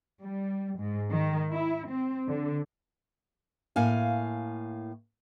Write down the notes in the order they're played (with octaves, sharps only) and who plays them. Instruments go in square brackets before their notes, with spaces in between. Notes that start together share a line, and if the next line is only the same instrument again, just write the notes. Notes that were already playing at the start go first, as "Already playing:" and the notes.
[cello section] G3
G#2
D#3
E4
C4
D3
[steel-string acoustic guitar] A2 A#3 F5 G#5